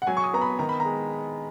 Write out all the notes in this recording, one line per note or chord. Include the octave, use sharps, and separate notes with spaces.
F#5
F#3 G#5
C#6
D#6
B3 A#5
B5
D#3 A#5
B5
A#5
G#3